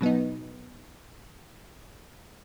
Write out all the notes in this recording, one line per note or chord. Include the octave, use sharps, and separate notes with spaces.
B2 F#3 B3 D#4